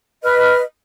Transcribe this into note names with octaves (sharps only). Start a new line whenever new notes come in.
B4 D#5 F6